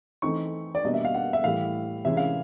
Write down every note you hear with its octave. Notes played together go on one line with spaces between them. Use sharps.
E3 A3 C4 D#4 C#6
D5
B2 G3 A#3 D4 D#5
E5
F5
F#5
E5
A2 E3 G3 F5
C3 E3 G#3 C#4 E5
F5